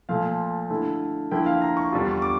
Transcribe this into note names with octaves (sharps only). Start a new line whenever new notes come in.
A#2 F3 A3 F5
D3 A3 E4
D3 F3 A#3 E4 G5
F5
A#5
C#6
E2 D3 G3 D4 F4
C#6
D6